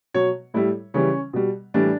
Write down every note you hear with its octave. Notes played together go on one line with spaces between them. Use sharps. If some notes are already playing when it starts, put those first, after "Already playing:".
B2 F#3 C#5
A2 G3 E4
C#3 E3 G3 C#4
B2 G3
A2 E3 G3 D4